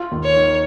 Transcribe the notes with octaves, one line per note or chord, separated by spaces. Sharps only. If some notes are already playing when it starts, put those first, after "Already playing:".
Already playing: F4
D#2
C#5
D#3